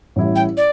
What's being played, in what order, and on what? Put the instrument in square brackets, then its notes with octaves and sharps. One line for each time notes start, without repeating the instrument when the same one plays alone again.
[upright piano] A1 A2 G3 E4
[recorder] G5
D5